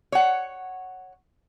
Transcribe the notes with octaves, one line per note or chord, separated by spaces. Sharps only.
C#5 F#5